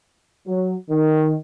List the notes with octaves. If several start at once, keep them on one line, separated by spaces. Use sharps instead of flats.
F#3
D#3